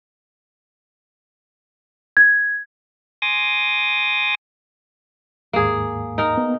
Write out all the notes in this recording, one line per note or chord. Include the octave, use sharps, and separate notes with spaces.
G#6
G#5 C6 D6 D#6 A6 A#6
D#2 G#2 A#3 G#4
D#4 A#4
B3